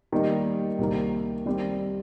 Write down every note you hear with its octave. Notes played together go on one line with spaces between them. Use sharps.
D#3 G3 A#3 D#4
C2 C3 D#3 A#3
D#3 G3 C4 G4